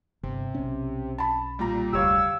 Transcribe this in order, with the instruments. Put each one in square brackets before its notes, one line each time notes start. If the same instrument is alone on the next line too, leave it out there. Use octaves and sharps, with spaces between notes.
[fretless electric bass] G1 [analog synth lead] C3
[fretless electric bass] B1 C#4
[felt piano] A5 B5
[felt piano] A#2 A#5 [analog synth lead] G3
[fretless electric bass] F1 D2 [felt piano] G4 C#5 F5 [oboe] E6